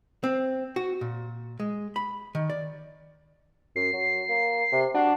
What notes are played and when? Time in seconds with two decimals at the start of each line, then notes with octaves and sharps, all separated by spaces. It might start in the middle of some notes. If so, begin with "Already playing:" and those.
0.24 C4
0.76 F#4
1.01 A#2
1.60 G#3
1.96 B5
2.35 D#3
2.50 D5
3.76 F#2 C7
3.93 F#3
4.29 A#3
4.72 C3
4.94 D4 F#4